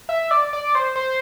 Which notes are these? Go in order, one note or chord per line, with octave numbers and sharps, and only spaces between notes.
E5
D5
D5
C5
C5